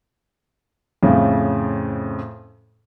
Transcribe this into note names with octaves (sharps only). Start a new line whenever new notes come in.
F2 A2 C#3